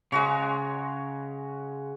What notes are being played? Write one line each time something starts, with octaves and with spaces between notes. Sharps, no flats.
C#3 G#3 F#4 C#5